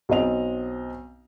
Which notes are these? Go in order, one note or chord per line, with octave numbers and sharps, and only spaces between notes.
B1 C4 D#5 F7